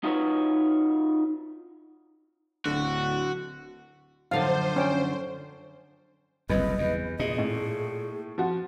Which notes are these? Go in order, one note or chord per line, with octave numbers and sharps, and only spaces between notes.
D#4 F4 F#4 A#4 B4 C#5
D1 D3 F#4
F#2 D3 F3 C5 F5
C#4 G5
F#1 C2 F2 B4 D#5
E2
A#2 G#4 D#5
A2
F3 F#4